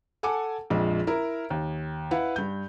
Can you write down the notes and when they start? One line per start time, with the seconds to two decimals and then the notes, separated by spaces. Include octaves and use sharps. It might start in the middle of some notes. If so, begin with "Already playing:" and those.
0.23 A4 F#5 G#5 A5 D6
0.70 A#1 F2 G#3
1.07 E4 A#4
1.50 D#2
2.11 E4 B4 F5 F#5
2.36 G2 G6